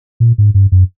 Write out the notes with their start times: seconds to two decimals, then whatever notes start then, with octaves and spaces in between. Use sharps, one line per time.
0.20 A#2
0.38 G#2
0.54 G2
0.72 F#2